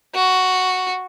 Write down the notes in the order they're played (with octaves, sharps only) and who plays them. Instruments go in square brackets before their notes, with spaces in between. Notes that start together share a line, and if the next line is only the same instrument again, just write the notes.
[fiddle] F#4